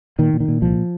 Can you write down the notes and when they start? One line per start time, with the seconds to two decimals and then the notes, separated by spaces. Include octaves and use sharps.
0.19 A#2 D#3
0.33 A#2
0.40 D#3
0.48 A#2
0.62 C2 F3